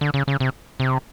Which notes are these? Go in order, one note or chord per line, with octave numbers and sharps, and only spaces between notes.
D3
C#3
C#3
C3
C3